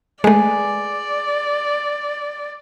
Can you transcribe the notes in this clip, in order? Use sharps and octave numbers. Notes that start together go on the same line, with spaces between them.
G#3 A3 G#4 B4 D5